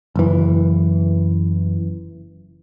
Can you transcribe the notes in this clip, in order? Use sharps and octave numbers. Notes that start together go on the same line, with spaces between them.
F#1 E3